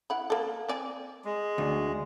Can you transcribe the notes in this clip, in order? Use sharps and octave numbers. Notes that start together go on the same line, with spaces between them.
E4 F#5 B5
A#3 A4
C4 D5 G#5
G#3
D2